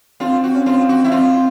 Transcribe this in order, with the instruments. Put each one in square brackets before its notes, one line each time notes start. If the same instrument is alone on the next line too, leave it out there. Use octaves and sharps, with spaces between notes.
[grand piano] C4 [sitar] F4
[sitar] F#4
[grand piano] C#4
[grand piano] C4 [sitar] F4
[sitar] F#4
E4
[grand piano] C4 [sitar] F4